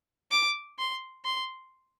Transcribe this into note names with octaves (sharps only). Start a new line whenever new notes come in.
D6
C6
C6